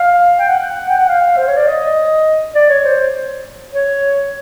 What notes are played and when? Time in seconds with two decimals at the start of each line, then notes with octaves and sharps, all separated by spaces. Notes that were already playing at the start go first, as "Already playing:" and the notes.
Already playing: F5
0.39 G5
0.49 F#5
0.89 G5
0.98 F#5
1.08 F5
1.37 C5
1.47 C#5
1.57 D5
1.67 D#5
2.55 D5
2.70 C#5
2.85 C5
3.73 C#5